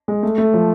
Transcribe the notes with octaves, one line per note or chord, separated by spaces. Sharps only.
G#3
A3
A3
F3